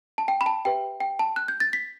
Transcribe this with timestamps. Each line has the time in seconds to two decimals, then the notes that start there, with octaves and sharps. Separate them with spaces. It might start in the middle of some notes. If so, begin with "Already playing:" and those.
0.18 A5
0.28 G5
0.41 B5
0.46 A5
0.65 G4 B4 E5 G5
1.00 G5
1.19 A5
1.36 F#6
1.48 G6
1.60 A6
1.73 B6